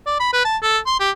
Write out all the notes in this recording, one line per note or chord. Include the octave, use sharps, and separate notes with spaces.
D5
B5
B4
A5
A4
C6
G4